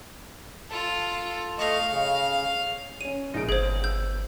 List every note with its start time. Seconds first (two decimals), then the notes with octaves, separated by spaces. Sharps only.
0.70 F4 A4
1.59 A3 D#5 F5 C#6
1.90 C#3
3.01 C#4 C#5 D#7
3.34 A#1 G#3 D#4 D7
3.49 G1 G#4 C5 G#6
3.84 E6 G6